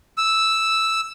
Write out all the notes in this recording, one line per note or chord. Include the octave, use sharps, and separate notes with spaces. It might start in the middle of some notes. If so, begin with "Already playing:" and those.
E6